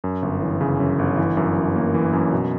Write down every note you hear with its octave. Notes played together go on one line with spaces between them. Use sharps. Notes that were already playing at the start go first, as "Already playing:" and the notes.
F#2
G1
E3
C#3
F#2
G1
E3
F#2
F#2
A#3
E3
F#2
B2